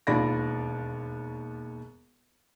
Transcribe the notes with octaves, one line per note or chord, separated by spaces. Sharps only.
E1 D#2 F4 D5 B5 A#6